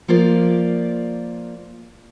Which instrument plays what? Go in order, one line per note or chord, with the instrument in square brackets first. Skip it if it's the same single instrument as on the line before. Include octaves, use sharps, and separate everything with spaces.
[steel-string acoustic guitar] F3 A#3 F4 D5